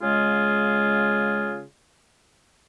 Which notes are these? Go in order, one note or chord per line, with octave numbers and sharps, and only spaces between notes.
C#3 G#3 F4 G#4